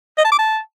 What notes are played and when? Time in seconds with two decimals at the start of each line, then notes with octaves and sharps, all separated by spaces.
0.18 D#5
0.25 A5
0.32 D6
0.39 A5